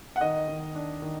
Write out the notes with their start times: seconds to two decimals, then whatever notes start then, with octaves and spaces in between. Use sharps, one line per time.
0.16 F#5
0.21 D#3 D#5
0.48 D#3
0.75 D4
1.02 D#3